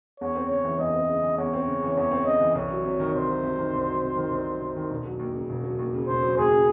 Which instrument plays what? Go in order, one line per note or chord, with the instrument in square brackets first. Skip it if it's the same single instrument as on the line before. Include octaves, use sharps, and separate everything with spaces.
[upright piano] E2 [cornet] C#5
[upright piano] C4
[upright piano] C#3 [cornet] C#5
[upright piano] E3
[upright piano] E2 [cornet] D#5
[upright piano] C4
C#3
E3
[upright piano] E2 [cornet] C#5
[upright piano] C4
C#3
E3
[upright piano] E2 [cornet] C#5
[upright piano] C4
[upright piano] C#3 [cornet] D#5
[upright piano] E3
[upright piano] C2 [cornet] C#5
[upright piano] F#3
C3
D#3
[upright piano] C2 [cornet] C5
[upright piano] F#3
C3
D#3
C2
F#3
C3
D#3
C2
F#3
C3
D#3
E1
F#3
D#2
C#3
E1
F#3
D#2
C#3
[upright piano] E1 [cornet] C5
[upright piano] F#3
[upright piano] D#2 [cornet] G#4
[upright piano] C#3